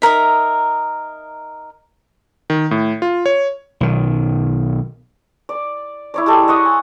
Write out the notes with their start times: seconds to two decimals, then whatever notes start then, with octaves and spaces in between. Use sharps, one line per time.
0.02 D#4 E4 A#4 E5
2.50 D#3
2.71 A2
3.02 F4
3.26 C#5
3.80 B1 D#3
5.49 D5
6.14 E4 C#5 D5
6.26 G#3 G4 A4
6.48 D#5 F#5 C#6 D#6
6.65 G#5